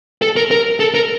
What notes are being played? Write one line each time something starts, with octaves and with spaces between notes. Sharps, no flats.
A4
A#4
A#4
A4
A#4